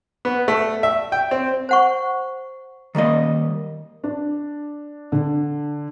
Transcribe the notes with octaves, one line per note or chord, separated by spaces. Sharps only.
B3
A3
E5
G5
C4
C5 F#5 C#6
D#3 G3 A#3 D#5
D4
D3